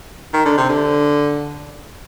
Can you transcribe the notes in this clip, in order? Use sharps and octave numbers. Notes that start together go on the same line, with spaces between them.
D#3
D3
C3
D3